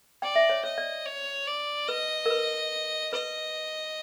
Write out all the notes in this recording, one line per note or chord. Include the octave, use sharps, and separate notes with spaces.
D5 G5
E5
C#5
C#5 D#5
D5
C#5
D5
B4 D#5
A#4
B4
B4 D#5